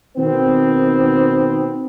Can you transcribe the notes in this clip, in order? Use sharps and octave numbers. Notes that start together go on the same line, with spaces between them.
B2 D#3 B3 C4